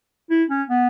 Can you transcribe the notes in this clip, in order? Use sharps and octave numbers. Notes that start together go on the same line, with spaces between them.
E4
C#4
B3